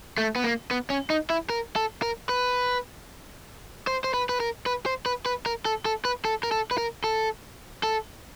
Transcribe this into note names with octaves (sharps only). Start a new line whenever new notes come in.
A3
B3
A#3
B3
C#4
D#4
E4
A#4
A4
A#4
B4
C5
C5
B4
B4
A#4
B4
C5
B4
B4
A#4
A4
A4
B4
A4
A#4
A4
B4
A#4
A4
A4